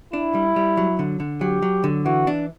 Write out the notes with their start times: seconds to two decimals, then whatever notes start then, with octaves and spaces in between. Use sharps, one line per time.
0.13 D4 E4
0.34 G3
0.56 G3
0.77 F#3
0.99 D3
1.20 D3
1.41 F#3 G4
1.62 F#3
1.84 D3
2.05 E3 F#4
2.27 D4